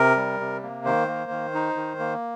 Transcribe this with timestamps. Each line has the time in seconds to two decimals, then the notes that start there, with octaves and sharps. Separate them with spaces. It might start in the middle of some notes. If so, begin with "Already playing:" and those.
Already playing: C3 A#4
0.17 G3
0.40 C3
0.63 A#3
0.85 D#3 C5
1.08 A#3
1.31 D#3
1.55 D#4
1.76 D#3
1.99 A#3